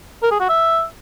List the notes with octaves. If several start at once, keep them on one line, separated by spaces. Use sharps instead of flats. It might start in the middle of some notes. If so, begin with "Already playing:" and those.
A#4
G#4
F#4
E5